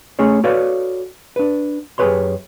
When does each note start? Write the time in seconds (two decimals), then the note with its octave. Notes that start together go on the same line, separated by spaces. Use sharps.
0.19 A3 C#4 G#4 C#5
0.44 F#4 A4 B4 C#5 D5 F5
1.36 D4 B4
1.98 F#2 G4 G#4 B4 C#5 C6